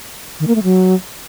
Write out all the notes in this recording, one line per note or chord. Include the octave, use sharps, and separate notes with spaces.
D#3
A#3
A3
F#3